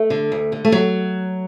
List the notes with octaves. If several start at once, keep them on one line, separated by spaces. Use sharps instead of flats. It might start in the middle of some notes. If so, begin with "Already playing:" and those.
Already playing: A3
D3
D2
D3
A3
F#3